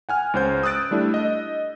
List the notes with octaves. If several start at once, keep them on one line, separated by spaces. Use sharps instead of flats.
F#5 G#5 F6
C#2 C#4 C5 G6
D#6 E6 F#6 A6 D7
G3 A3 D4 E4
D#5 F#6